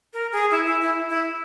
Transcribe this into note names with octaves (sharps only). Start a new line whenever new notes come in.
A#4
G#4
E4
E4
E4
E4